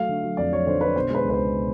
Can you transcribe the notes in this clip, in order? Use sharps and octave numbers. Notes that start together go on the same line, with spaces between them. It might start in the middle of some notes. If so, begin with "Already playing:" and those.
Already playing: F#3 A3 F5
D3
F#3
F2 D5
F#3 C#5
D3 C5
D3 B4
B2 C5
G#3 B4
C#2
B4
C5
C#2
B2